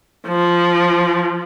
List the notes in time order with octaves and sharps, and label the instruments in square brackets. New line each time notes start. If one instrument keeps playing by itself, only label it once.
[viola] F3